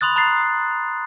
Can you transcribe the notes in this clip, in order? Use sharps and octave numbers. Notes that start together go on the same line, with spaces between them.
B5 C6 D#6 F#6 A6
A#5 B5 F#6 A6 C7